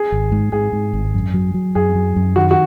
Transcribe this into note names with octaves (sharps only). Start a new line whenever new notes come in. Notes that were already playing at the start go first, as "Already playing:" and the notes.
Already playing: G#4
G#1
G#2
G#2 G#4
G#2
G#1
F#2
F#3
F#3
F#2 G#4
F#3
F#2
D#3 F#4
F#4